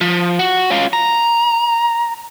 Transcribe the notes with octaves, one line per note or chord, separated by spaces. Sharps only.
F3
F#4
C#4 F4
A#5